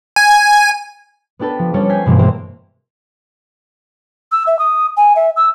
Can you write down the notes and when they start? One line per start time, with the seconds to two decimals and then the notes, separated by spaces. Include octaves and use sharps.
0.16 G#5
1.39 B3 D4 G4 A4 B4
1.59 F3
1.74 F3 G3 C#4 A4 C#5
1.90 G#5 G6 B6 C7
2.06 G2 B2 E3 A#3 C4
2.18 G#3 A#3 G4 C5 E5
4.32 E6
4.47 E5
4.59 D#6
4.97 G#5
5.16 E5
5.36 E6